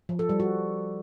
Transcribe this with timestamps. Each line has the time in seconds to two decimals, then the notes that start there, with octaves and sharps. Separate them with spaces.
0.09 F3
0.19 A4
0.29 G3
0.40 F#4